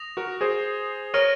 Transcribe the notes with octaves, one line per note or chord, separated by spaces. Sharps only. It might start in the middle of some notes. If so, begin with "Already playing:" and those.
Already playing: D#6 A#6 F7
F#4 A#4
G#4 C5
A#4 C#5 C#6 F6 A#6 D#7